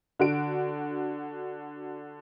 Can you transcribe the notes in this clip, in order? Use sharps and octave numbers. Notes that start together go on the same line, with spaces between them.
D3 F#4 D7